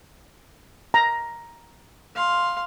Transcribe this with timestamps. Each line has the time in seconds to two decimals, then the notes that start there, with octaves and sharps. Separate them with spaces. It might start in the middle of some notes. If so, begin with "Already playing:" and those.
0.94 A#5
2.16 F5 C6